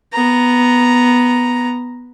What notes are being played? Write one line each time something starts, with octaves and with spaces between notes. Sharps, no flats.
B3 A#5